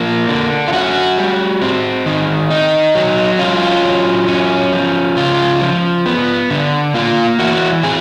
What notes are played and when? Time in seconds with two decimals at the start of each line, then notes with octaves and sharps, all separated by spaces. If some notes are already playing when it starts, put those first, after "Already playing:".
Already playing: F3 A#3
0.29 D3
0.68 F4
0.73 C#4 F#4
1.18 G3
1.62 C4
2.06 D#3
2.50 D#4
2.95 F#3
3.39 C#4 F4
3.84 F#3
4.28 C#4
4.72 F3
5.17 C#3 F4
5.61 F3
6.06 B3
6.50 D3
6.94 A#3 F4
7.39 E3 F#4
7.83 C4 G#4